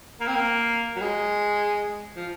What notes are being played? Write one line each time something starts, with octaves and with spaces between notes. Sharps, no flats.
A#3
C4
A#3
F#3
G#3
F3